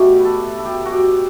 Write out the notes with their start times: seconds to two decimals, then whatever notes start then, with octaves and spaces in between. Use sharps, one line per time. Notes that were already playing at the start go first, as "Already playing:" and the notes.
Already playing: B2 A3 G4
0.20 B4
0.25 A4
0.58 A4
0.65 G4
0.85 F#4
0.92 G4